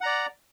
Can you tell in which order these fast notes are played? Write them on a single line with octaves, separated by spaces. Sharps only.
F#5 A#5 D5